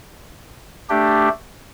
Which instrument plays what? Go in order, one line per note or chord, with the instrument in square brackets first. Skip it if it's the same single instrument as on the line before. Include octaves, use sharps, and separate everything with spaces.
[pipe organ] A3 D4 G4